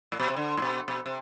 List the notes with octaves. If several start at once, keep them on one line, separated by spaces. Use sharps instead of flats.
A2
B2
C3
D3
A2
B2
B2
C3